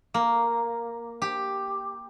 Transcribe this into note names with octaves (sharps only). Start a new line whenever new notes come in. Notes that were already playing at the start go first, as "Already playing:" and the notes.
A#3
G4